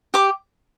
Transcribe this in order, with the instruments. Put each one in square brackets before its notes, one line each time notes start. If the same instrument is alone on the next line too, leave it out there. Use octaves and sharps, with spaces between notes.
[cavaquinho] G4 D6